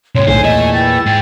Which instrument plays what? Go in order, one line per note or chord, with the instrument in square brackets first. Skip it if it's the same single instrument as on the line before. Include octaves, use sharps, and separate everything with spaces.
[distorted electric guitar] G#2 C3 [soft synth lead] C#5 [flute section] C6
[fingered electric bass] B1 A2 D3 [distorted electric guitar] C5 [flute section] G#5
[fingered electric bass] E2 A#2 [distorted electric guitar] A3 [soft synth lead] D#5
[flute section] E4 B4 G5 [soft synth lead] A6
[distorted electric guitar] G#2 G#4 [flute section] G5